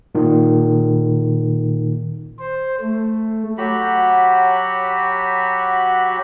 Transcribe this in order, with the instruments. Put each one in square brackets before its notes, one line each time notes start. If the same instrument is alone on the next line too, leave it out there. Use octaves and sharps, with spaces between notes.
[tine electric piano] A#2 D#3
[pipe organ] C5
A3
[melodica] F#3 F#4 G4 B5